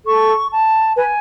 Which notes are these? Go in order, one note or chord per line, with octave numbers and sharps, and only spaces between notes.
A4 C#6
A5
B4 G#5